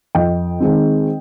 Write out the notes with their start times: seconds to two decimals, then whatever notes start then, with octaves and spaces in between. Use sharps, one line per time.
0.15 F2 D#5 G5
0.60 D#3 G#3 C4